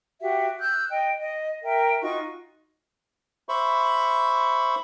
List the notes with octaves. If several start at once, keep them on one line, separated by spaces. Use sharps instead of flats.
F#4 G4 E5 F#5
E6 F#6 G6
D#5 G5
D#5
A#4 E5 G5
D#4 F4 F#4 C#6
C5 E5 B5 C#6